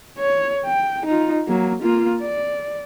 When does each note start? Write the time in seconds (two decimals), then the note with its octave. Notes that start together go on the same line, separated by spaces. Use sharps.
0.19 C#5
0.66 G5
1.06 D#4 F4
1.48 F#3 A#3
1.83 A#3 F4
2.22 D5